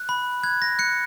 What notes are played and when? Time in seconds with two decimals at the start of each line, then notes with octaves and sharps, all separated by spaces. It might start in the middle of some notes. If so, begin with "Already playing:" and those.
Already playing: F#6
0.09 B5
0.43 F#6 G#6
0.62 A#6
0.79 F#6 C#7